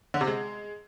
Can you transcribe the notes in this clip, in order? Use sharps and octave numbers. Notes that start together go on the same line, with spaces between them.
D3
C3
G#3